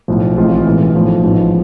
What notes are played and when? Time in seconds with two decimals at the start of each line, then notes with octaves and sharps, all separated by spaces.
0.08 B1 A2 F3
0.37 A1 A2 G#3 C4 F4
0.66 B1 A2 E3
0.95 B1 A2 F3
1.24 A1 G#2 F3 B3